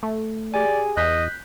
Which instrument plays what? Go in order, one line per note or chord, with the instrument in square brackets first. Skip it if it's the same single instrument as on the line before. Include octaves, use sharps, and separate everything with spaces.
[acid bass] A3
[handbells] G4 G#4 G#5 [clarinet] D5
[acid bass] E2 [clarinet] D#5 [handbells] F#6 G6 B6